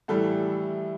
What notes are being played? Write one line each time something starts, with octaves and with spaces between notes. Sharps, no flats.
A2 E3 G3 A4